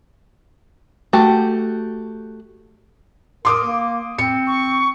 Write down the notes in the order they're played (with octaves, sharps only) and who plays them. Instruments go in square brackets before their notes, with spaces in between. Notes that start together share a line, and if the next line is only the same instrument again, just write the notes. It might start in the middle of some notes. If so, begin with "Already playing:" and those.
[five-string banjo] A3 F#4 G4
[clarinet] A#4 [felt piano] C6 D6 D#6
[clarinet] A#3
[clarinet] C4 [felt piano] C#7
[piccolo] C#6